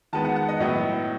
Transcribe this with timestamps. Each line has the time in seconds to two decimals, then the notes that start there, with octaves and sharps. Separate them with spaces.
0.13 D#3 G#3 B3 A5
0.25 F#5
0.36 F#5
0.48 D#5
0.60 A2 F#3 B3 D#5